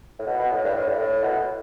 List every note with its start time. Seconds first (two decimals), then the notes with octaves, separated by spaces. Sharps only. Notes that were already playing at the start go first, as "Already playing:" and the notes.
0.19 A2
0.27 B2
0.39 B2
0.51 A2
0.64 G2
0.74 A2
0.88 G2
0.98 A2
1.22 B2
1.37 A2